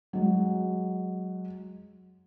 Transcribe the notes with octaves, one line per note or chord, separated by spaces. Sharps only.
F#3 G#3